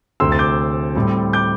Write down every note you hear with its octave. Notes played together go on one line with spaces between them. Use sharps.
D2 C3 A3 C4 C6 E6
A6
D6 G6
A2 G3 C4
D6 G6